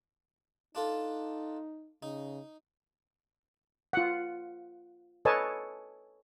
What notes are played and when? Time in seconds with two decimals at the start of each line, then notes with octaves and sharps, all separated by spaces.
0.75 D4 D#4 F4 A4
2.03 C#3 D#4
3.93 F4 F#5
5.25 A4 B4 C#5 D#5 G#5 A5